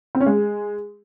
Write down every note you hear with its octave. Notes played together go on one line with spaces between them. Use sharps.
C4
C#4
G#3